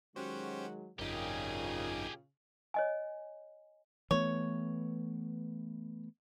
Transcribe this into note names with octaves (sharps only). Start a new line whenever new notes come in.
D#3 F#3 G#3 C#4 F#4 G4 C5
G#1 F#2 A#2 C#3 D#4 F4 G4 G#4
C#5 D#5 G#5
E3 A3 B3 C#5